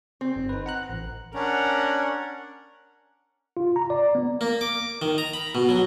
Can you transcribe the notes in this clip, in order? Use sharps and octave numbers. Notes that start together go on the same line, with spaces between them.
C4
G1
D#4 B4
F#5 A#5 F#6
A1
C#4 D4 A#4 F#5
F4
A#5
D5
B3
A#3
D6
D#3
A#5
B5
B2
F#3